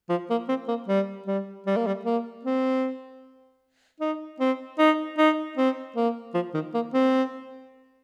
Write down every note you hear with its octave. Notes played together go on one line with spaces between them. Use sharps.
F3
A#3
C4
A#3
G3
G3
G3
A#3
G3
A#3
C4
D#4
C4
D#4
D#4
C4
A#3
F3
D#3
A#3
C4